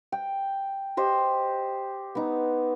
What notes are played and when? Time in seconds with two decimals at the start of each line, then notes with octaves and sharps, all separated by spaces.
0.12 G5
0.97 G4 C5 D#5
2.15 B3 D#4